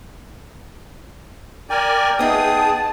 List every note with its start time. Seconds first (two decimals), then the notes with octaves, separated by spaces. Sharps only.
1.70 A#4 D5 G5 G#5
2.19 B3 D#4 G#4 E5 A5 D#6